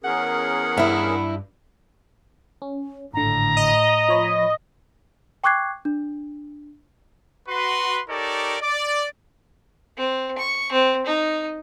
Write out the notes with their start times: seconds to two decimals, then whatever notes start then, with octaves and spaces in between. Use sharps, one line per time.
0.04 E2 C#4 G#4 A#4 F#5
0.77 G2 E4 E5
2.62 C#4
3.14 G#1 A2 D3 A#5
3.57 D#5
4.09 F3 C#5 B5
5.44 G5 C#6 D6 F#6 G#6 C7
5.85 D4
7.49 F#4 B4 C6
8.09 D#4 G4 A4 A#4 C#5 D5
8.62 D5
9.97 C4
10.38 C#6
10.72 C4
11.06 D#4